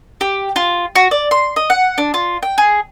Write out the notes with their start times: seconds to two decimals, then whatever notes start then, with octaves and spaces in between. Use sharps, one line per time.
0.21 G4
0.56 F4
0.96 F#4
1.11 D5
1.31 C6
1.56 D#5
1.70 F#5
1.98 D4
2.14 F4
2.43 G5
2.58 G#4